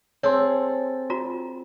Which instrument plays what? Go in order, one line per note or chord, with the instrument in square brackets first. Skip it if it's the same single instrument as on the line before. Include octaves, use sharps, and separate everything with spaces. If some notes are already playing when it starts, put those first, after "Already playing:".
[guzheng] C4 G#4 A4 [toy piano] C#5 C6
[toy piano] F4 F#4 A#5